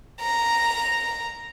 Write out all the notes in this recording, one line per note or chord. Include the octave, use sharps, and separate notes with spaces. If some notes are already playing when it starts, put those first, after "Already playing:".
A#5